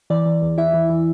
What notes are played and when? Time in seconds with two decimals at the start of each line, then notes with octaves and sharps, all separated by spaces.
0.10 E3 D5
0.26 E3
0.42 E2
0.58 E2 E4 E5
0.74 E3
0.90 E3